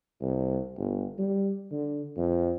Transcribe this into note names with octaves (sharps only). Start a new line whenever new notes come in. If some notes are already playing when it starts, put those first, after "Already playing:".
C2
G1
G3
D3
F2